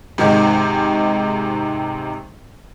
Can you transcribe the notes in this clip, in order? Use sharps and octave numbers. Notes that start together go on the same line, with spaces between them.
G#2 C3 D#3 G#3